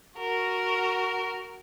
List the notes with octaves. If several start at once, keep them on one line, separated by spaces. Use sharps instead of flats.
F#4 A#4